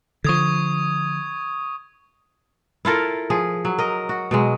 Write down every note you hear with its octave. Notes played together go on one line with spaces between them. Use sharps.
D3 F3 C#6 D#6 G#6
E4 F4 A4 A#4
F3 G#4
F#3
A#4 D#5
F#4
B2 F#3 G#3